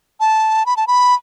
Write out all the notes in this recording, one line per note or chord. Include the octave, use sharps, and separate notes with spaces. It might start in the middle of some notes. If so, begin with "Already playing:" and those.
A5
B5
A5
B5